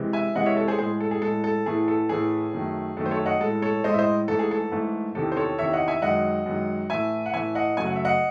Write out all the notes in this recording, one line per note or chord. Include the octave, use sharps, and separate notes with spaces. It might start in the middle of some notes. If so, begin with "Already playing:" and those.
Already playing: C3 E3 G#3
E5 G#5
C3 E3 G#3 D#5 F#5
C#5 E5
A4 C#5
G#4 C5
A2 G#3 G#4 C5
A4
G#4
A2 G#3 A4
A4
A2 E3 A3 G#4
A4
A2 E3 A3 G#4
F#2 D#3 A3
F#2 D#3 A3 A4
C5
A4 C#5
D#5 F#5
A2 G#3 A4
A4 C#5
A2 G#3 C5 D#5
E5
C5 D#5
G#2 E3 A3 A4
G#4
A4
G#2 E3 A3
E2 C3 D#3 A4
C5
A4 C#5
E2 C3 D#3 C#5 E5
D#5 F#5
E5 G#5
F#2 D#3 G#3 D#5 F#5
F#2 D#3 G#3
A2 E3 A3 E5 G#5
F#5
A2 E3 A3 E5 G#5
D#5 F#5
F#2 C#3 F#3 A3 G#5
F#5
E5
D#5 F#5